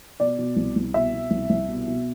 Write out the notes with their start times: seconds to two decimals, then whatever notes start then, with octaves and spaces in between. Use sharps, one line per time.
0.20 B2 D5
0.39 B2
0.56 C2
0.76 C2
0.94 B2 E5
1.13 B2
1.31 C2
1.50 C2
1.68 B2
1.88 B2